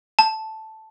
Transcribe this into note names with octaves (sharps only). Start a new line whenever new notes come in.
A5